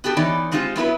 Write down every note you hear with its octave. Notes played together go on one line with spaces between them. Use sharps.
B3 F#4 G4 A4
E3 B3 D#4 C#5 D5
G#3 C4 D#4 F4 G4
F#3 B3 E4 B4